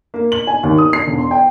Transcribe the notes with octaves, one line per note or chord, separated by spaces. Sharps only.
A#3
F#7
G#5
D#2
D#6
C7
E1
C6
G5